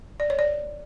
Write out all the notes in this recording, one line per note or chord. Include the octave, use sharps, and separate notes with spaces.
D5
C#5
D5